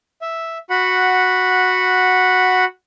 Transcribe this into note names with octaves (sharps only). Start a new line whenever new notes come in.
E5
F#4 F#5 B5